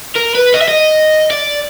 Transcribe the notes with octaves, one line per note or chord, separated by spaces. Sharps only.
A#4
B4
D#5
E5
D#5
D5